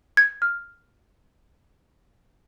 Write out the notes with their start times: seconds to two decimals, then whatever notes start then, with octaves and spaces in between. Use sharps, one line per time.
0.17 G#6
0.42 F6